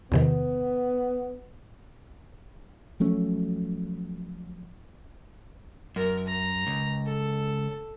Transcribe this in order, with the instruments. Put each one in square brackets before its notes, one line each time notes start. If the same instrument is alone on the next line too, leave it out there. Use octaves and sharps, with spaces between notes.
[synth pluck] E2 C3 D#3 [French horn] B3
[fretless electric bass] F3 F#3 A3 C#4
[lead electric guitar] F#2 [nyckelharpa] A#4
[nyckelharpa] A#5
[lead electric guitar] C#2
[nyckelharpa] A4